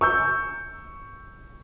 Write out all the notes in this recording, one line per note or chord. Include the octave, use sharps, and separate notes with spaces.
C#6 E6 G6